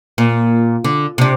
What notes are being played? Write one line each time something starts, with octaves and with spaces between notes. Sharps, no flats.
A#2
D3
C3 D4